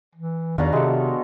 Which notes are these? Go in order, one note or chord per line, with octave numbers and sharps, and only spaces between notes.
E3
E2 B2 D#3 D4 C#5 F5 A#5
C3 G#3 A4